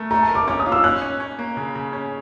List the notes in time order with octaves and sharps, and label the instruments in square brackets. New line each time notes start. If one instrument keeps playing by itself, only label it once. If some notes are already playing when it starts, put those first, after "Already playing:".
Already playing: [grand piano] A3 A#4
[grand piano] A3 [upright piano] A#5
[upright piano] A5
[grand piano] A#4
[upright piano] D6
[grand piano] C#4 [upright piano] D6
[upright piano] D#6
[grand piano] F4
[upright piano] E6
[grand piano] C#4 [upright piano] F#6
[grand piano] C#4
C#4
A#3
C#3
C#3
C#4